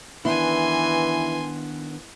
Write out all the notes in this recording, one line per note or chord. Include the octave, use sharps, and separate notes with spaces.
D#3 E3 B3 D4 E4 G#5 C6